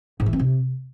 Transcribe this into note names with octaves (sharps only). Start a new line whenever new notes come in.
G#2
E3
C4
C3